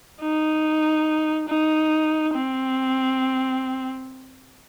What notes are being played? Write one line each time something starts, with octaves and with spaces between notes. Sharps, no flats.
D#4
D#4
C4